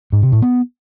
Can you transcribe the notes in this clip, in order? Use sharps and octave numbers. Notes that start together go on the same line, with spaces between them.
G#2
C3
A2
B3